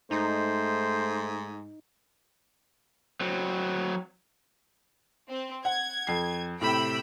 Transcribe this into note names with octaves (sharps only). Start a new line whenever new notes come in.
G#2 A3 D#4 C5
F#3 C4
C4
F#5 G#6
F2 C7
A2 C3 G5 B5 E6